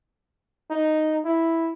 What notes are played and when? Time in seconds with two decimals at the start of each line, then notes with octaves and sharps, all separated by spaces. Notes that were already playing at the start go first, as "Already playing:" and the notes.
0.70 D#4
1.25 E4